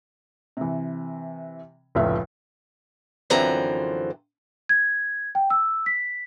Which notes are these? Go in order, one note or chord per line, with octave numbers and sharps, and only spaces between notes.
C3 E3
F1 C#2 A2 E5
F#2 D3 E3 F3 C4 A#5
G#6
G5
E6
B6